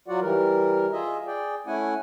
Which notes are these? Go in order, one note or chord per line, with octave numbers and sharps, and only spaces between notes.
F#3 F4 F#4 D5 F#5
E3 G3 A#4
F4 G#4 D#5 E5
G#4 D5 G5
A3 C#4 E4 F#5 G#5